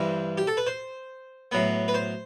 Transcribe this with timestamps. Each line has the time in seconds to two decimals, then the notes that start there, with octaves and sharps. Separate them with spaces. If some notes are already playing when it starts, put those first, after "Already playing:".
Already playing: G2 E3 G3 C4 C5
0.38 G4
0.47 A4
0.57 B4
0.67 C5
1.52 A2 F#3 B3
1.88 B4
1.94 C5